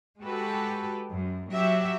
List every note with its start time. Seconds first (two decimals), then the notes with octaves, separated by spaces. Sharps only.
0.21 G#3 F#4 G4 A4 B4
1.12 F#2
1.52 F#3 F#4 G4 E5